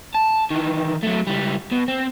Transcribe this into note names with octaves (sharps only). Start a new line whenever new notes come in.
A5
D#3 E3
F#3 A3
C#2 G3
B2
C4